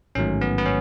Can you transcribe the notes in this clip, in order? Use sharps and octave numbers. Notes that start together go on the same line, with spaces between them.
A1 G#2 D#3 F#3 A3 C#4
B3
B3
C#4